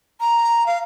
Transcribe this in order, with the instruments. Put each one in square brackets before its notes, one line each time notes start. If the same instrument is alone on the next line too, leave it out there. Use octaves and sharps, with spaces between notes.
[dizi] A#5
F5